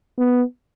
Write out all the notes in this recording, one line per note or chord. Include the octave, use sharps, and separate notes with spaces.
B3